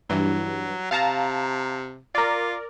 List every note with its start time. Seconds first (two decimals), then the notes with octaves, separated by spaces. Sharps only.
0.10 G2 E3 F#3
0.91 C3 F5 A5 A#5
2.15 F4 A#4 D5